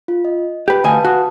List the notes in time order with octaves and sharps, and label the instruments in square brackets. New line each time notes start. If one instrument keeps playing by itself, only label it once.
[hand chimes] F4
D#5
[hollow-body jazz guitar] G4 B4 [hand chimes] G6
[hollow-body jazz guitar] D2 D#5 G#5 [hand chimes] B4 F5 A5
[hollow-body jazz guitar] F#4 [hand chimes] A5 D#6